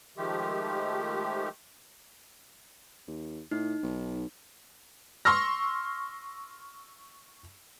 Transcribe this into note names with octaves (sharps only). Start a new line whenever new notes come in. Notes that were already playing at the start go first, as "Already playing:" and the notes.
D#3 F3 G#3 A3 G4
D#2
A2 D#4
B1
C6 C#6 E6 F6 A#6